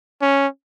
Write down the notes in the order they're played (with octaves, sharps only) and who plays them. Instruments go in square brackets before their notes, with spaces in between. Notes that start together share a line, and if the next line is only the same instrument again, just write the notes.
[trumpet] C#4